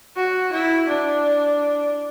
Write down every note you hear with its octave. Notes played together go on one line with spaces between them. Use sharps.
F#4
E4
D4